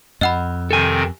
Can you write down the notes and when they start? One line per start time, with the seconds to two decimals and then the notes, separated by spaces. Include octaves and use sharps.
0.21 F2 D#5 F#5 B5
0.71 C3 D#3 C4 A4 G#5